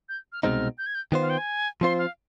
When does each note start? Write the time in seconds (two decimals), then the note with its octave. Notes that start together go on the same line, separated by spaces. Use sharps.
0.09 G6
0.33 F6
0.43 C2 B2 G#3 C4 D#4 F6
0.78 G6
0.86 G#6
0.95 G6
1.12 D#3 B3 F4 C5
1.21 F5
1.30 G5
1.38 G#5
1.81 F3 C4 F4 C5 C6
1.98 F5